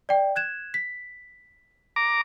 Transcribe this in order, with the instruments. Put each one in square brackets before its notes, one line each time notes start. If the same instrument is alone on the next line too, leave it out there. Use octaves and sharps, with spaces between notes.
[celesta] D5 G5
F#6 G#6 E7
B6
[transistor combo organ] A#5 D6